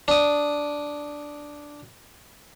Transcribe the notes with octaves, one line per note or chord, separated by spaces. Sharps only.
D4 D#6